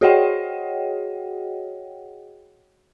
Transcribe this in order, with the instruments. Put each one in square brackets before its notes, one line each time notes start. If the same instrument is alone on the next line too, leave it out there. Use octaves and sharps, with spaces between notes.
[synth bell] F#4 G#4 C#5 D#5 F#5 G5